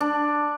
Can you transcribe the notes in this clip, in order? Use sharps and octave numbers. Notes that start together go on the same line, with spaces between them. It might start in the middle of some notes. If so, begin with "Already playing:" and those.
D4